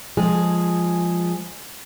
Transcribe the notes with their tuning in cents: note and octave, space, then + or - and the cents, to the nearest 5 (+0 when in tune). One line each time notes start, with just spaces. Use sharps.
F3 +0 G#3 -10 G#4 +0